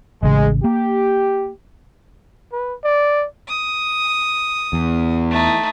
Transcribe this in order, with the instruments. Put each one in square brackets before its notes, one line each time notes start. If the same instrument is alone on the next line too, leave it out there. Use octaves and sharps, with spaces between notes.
[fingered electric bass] A1 C#3 [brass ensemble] G#3
[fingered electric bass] A#3 [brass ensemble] G4
[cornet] B4
D5
[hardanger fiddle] D#6
[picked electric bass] E2
[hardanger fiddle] A3 D#4